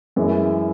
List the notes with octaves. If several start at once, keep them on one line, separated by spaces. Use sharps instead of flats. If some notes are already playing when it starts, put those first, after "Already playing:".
F#2 E3 G#3